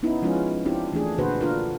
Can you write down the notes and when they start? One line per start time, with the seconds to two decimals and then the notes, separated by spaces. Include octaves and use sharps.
0.03 B3 C#4 D#4 E4
0.22 F3 G#3 C#4 F4 B4
0.66 C4 D4 E4 F4 G4
0.92 E3 A3 D4 G#4
1.18 A#2 D3 F#4 B4 C5
1.41 D4 F4 A#4